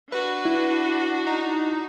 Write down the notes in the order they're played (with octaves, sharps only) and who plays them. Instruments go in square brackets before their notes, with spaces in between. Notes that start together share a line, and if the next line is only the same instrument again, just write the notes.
[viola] D4 F#4 [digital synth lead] B4
[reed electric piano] E4
[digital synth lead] D#4